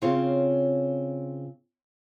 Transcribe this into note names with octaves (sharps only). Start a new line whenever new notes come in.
C#3 C4 F4 C#5